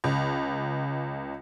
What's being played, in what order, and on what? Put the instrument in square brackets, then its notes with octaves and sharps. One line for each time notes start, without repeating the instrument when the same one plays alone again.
[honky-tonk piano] C#2